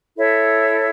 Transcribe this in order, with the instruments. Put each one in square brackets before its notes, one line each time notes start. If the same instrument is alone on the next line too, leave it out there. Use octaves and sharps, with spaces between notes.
[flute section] E4 A4 C#5 E5